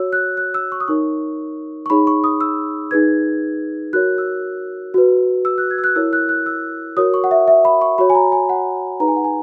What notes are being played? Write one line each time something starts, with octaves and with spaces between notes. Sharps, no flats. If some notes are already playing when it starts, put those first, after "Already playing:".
Already playing: F#4 C#5 E6
F#6
F#6
E6
C#6
D#6
D#4 A#4 C#5 C#6
C#6
D#4 G#4 C#5 B5
C#6
D#6
E6
D#4 G#4 B4 G#6
F#4 A#4 C#5 F#6
E6
F#4 B4
E6
F#6
G#6
E6
F#6
E4 A#4 C#5 E6
F#6
F#6
E6
F#4 A#4 C#5 D#6
C#6
F#5
E5
E5
B5
C#6
F#4 C#5 B5
G#5
A#5
G#5
F#5
D#4 G#4 B4 A#5
G#5
F#5
G#5